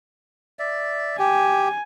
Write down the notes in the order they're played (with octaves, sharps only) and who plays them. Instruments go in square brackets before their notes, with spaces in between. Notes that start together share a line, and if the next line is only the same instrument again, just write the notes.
[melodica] D5 E5
[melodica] G4 [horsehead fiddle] G#5